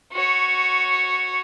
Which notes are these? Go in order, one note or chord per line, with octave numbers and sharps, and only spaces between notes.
F#4 C#5